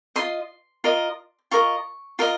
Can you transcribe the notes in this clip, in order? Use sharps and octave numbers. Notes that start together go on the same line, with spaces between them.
F4 A#4 D#5 C6
F4 A#4 D#5
F4 A#4 D#5 C#6
F4 A#4 D#5